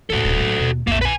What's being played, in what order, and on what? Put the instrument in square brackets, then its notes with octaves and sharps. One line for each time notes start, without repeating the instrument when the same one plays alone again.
[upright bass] E2 A2 [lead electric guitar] F#4 A4
[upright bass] D1 A1
A2 F#3
D#2 B2
[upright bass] A#1 F2 [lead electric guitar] A#3 E5
[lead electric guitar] B4 G#5